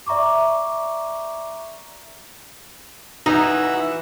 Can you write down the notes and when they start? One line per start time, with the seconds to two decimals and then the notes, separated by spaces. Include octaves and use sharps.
0.07 D5 E5 A#5 C#6 D6
3.26 E3 D#4 F#4 E5 A#5